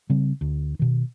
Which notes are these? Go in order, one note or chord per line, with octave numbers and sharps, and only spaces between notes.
C#3 G3 C4
D2
B2 D#3